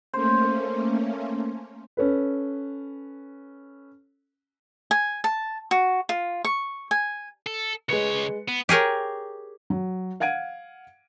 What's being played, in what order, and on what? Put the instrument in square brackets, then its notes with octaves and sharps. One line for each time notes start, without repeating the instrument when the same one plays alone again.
[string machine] A3 A#3 C#4 [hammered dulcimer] C5
[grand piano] C#4 A4 B4
[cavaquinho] G#5
A5
F#4
F4
C#6
G#5
[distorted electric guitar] A4
[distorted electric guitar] C#2 C#5 [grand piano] G#3 B4 C#7
[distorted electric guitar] B3
[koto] G4 G#4 A#4 C#5
[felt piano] F#3
F5 F#5 G#6 D7 D#7